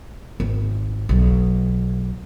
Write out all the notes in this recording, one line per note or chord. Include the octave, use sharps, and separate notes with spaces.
G#1
B1